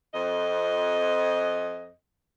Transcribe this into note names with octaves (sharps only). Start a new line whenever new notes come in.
F2 D#5